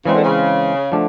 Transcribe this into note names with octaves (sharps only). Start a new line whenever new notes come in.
C#3 E3 G#3 C4
D3
C#3
D3 F3 A3 D4